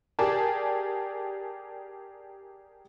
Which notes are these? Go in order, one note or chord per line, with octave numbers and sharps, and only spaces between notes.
G4 G#4 A#4 D5 A5